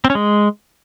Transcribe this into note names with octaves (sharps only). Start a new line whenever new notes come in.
C4
C#4
G#3